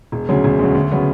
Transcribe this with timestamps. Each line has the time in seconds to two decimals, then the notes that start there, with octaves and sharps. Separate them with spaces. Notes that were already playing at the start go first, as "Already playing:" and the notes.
0.12 E1
0.29 D2 C#3 F#3
0.44 E1
0.59 D2 C#3 F#3
0.75 D2
0.91 C#3 F#3 B3